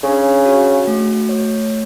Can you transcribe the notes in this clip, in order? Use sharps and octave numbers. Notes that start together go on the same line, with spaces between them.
C#3 D4
F#4
A3
C#5